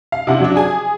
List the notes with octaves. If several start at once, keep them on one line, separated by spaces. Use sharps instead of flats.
F5
C3 D4 E4 F#5
F#3 D4
G#4 G#5